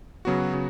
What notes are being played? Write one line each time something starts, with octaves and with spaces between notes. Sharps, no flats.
C#3 F#3 B3 F#4
C#3 F#3